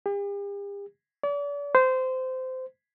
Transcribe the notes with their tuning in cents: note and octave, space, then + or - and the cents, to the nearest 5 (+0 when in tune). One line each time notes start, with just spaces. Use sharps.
G4 +45
D5 -40
C5 -20